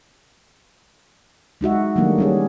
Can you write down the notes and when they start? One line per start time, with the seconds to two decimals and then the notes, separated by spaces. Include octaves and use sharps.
1.61 G#3 D#4 F#4 E5
1.96 D#3 F#3 G3 A3 A#3 D4
2.19 G3 C#4 G#4